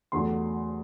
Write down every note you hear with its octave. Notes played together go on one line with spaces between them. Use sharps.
E2 D3 F#3 A3 C6